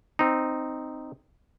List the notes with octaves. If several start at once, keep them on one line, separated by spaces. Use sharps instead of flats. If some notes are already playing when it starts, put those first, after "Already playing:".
C4 D#4